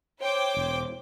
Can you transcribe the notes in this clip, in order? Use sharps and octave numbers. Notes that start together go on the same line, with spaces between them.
C5 C#5 G5 D6
E1